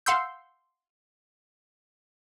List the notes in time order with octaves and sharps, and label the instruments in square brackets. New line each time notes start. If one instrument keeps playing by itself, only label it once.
[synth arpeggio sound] F5 F#5 C6 E6 G6